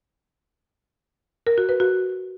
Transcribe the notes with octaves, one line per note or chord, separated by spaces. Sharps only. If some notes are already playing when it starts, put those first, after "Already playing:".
A#4
F#4
B4
F#4